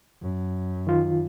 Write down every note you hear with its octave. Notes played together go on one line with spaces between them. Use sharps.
F#2
D#3 F4